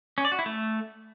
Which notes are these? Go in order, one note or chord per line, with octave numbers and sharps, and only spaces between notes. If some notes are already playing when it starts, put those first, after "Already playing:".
C#4
D5
F#4
E4
A3